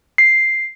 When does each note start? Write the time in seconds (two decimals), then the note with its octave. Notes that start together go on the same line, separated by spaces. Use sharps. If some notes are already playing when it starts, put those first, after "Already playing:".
0.18 C7